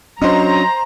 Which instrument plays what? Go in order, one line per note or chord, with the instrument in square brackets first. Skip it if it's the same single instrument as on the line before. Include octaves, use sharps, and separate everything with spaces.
[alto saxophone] F#3 [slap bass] C#4 D4 [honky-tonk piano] C5 D#5 [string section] A#5